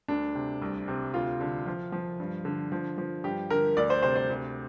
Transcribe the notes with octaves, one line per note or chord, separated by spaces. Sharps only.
D2 D4
C3
C2
C3
D2 F4
D3
F3
F3
G2
D3
F3
F3
G2 G4
D3 A#4
D2 D5
C5
C3 C5
C5
D2